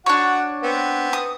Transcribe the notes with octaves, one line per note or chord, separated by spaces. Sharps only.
D4 F#4 C#5 F#5
B3 C4
D#6